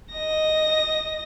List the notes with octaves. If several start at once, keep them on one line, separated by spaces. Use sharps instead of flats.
D#5 A#6